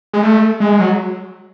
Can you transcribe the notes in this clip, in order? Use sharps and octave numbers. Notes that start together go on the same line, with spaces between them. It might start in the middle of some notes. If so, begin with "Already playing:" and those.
G#3
A3
G#3
F#3